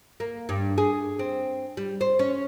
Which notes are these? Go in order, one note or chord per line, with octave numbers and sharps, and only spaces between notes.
A#3
G2
G#4
C4
G3
C5
C#4